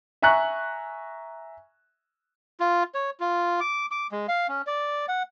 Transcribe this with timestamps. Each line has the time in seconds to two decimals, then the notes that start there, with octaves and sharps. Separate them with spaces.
0.22 E5 G#5 A#5 C#6 F#6
2.60 F4
2.94 C#5
3.20 F4
3.61 D6
3.91 D6
4.12 G#3
4.28 F5
4.49 C#4
4.67 D5
5.09 F#5